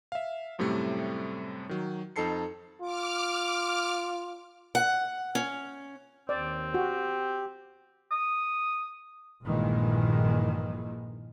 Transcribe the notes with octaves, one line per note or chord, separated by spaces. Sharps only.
E5 F5
F#2 A2 C3 G3 A3
D#3 F#3
F2 D#4 A4 A5 C7 C#7
F4 D6 F6
F#5
C#4
D#2 C4 D5
F#4 G4
D#6
A#1 G2 A#2 D#3 E3 G#3